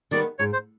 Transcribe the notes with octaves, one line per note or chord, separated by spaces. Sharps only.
D#3 G3 B3 D5
G#2 C#5
C5